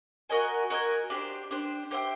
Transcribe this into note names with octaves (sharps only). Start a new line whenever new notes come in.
F#4 A#4 D#5 G#5
F#4 A#4 D#5 G#5
D4 G4 C5
D4 G4 C5
G4 C5 E5 G5